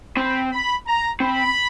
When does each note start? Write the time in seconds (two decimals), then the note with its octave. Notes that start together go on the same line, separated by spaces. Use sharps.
0.17 C4 B5
0.52 B5
0.86 A#5
1.20 C4 B5